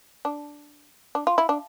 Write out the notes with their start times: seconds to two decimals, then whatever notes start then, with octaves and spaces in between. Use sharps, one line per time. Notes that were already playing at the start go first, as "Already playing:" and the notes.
0.25 D4
1.15 D4
1.27 F4
1.38 E4
1.49 D4